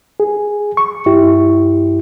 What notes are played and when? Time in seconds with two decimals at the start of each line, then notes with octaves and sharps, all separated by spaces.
0.20 G#4
0.77 C#6
1.06 G2 E4 G4